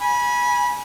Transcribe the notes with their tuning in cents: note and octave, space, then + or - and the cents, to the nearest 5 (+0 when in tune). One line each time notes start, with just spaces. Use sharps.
G#5 +5 B5 -25